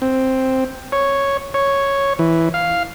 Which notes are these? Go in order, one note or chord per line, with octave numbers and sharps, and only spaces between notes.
C4
C#5
C#5
E3
F5